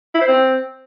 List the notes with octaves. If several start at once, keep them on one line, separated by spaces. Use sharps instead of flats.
E4
C5
C4